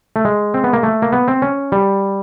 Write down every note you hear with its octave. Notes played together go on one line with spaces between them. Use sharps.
A3
G#3
C4
B3
A#3
A3
A#3
B3
C4
C#4
G3